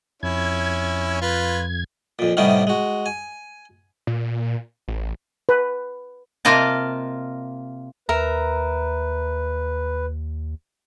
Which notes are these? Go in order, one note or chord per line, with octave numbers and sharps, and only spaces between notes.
F2 C#4 E4 G#6
F4 B4
F2 A#2
A2 C3 G3 B3 C#4 D#4
G#3 F#4
G#5
A#2
A1
B4
C3 A#3 F4 D#5 A5
D#2 A#4 B4 E5 A#5